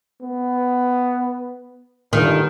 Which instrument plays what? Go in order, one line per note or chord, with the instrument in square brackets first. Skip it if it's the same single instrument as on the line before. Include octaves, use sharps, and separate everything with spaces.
[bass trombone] B3
[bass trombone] G1 [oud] D#3